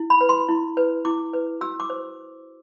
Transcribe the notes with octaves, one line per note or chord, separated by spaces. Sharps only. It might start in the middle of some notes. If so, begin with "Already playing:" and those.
Already playing: E4
B5
B4
C6
E4
B4
E4 D6
B4
F#4 E6
D6
C5